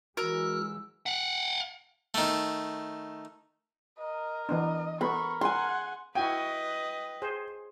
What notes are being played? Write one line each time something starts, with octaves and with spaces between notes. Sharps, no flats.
E3 F#3 G#3 F#4 A#4 E6
F5 F#5
D#3 A3
A#4 D#5
E3 B3 D4 D#5
B3 A4 A#4 B5 C#6
F#5 G#5 C6
E4 F#4 B4 D#5 G5 G#5
G#4 C5